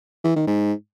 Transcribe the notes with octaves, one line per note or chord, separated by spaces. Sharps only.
E3
D#3
G#2